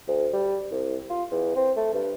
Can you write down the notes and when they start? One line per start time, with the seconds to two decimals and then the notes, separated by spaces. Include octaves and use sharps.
0.08 D2
0.33 G3
0.72 C2
1.10 F4
1.31 E2
1.56 C4
1.77 A3
1.93 G2